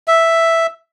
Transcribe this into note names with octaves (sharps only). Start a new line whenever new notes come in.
E5